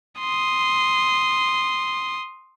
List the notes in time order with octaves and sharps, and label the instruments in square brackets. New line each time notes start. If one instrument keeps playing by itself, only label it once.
[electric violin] C6 D#6